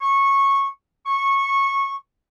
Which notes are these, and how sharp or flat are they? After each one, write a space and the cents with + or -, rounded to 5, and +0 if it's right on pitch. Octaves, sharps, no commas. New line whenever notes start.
C#6 -15
C#6 -15